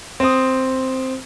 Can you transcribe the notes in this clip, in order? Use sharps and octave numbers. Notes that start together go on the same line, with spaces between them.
C4 D#6